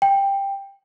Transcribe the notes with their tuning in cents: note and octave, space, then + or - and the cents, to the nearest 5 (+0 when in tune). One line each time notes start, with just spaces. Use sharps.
G5 +10